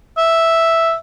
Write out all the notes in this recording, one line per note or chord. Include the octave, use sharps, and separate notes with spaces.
E5